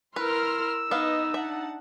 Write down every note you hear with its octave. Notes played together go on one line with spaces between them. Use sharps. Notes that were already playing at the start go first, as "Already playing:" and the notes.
E4 A#4 B4 C6 E6 F6
B3 D#4 B4 D#5 F5
D4 E5 F#5 A5